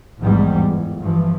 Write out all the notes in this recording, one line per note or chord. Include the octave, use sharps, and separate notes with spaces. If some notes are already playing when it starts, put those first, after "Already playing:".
A#1 E2 G#2 G3
G1
G2 E3 F3